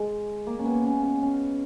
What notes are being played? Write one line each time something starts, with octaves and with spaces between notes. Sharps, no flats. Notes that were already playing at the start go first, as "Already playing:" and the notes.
Already playing: G#3
A#3
C#4
B3
C#4
C#4
C#4